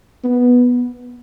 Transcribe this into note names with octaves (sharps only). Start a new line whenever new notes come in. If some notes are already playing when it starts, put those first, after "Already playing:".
B3